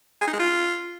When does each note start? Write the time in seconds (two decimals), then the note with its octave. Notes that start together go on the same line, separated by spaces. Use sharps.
0.21 G#4
0.27 D#4
0.33 G#3
0.39 F4